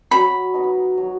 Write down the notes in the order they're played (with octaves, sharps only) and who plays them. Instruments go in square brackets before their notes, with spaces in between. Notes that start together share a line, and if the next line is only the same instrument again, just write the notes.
[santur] F#3 [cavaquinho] B5
[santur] B3 D#4
F#3